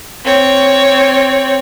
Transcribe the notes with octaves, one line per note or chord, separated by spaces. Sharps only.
C4 C#5